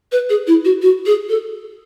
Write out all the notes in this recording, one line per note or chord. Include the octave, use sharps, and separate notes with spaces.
B4
G#4
E4
F#4
F#4
G#4
A4